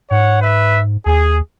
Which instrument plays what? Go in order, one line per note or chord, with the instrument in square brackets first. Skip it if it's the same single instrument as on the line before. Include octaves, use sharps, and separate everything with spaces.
[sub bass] G#2 [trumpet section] C#5 F#5
[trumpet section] B4 E5
[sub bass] D#2 [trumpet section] G#4